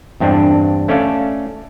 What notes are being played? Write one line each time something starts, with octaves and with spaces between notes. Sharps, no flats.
E2 G2 C4 D4
A3 C#4 A4 D5 F5